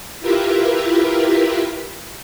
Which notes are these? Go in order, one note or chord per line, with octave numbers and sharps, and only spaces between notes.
E4 F4 G4 A#4 B4 E5